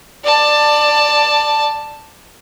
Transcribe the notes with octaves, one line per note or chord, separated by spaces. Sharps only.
D5 A5